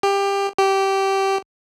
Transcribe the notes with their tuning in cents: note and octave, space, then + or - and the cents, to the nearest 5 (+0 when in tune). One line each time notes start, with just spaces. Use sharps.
G4 +20
G4 -15